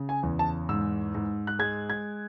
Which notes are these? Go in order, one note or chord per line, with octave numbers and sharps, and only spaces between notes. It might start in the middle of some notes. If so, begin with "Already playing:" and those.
Already playing: C#3
G#5
E2
A5
G#2 E6
G#2
F#6
G#3 G#6
G#6